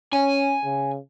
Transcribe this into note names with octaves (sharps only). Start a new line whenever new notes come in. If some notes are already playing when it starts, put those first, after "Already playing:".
C#4 G#5
C#3